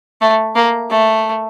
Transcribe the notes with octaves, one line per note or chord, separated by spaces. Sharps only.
A3
A#3
A3